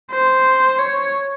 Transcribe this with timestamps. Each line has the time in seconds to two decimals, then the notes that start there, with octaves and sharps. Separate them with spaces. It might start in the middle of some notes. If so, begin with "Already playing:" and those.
0.12 C5
0.79 C#5